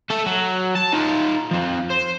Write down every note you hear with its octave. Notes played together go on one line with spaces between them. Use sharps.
A3 A4
F#3
A5
D#4 F4
F3 C4
C5